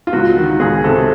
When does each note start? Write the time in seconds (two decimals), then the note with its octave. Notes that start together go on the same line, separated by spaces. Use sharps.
0.07 F4
0.13 C#2 F#4
0.37 D#3
0.60 C#2 G#4
0.84 C3 A4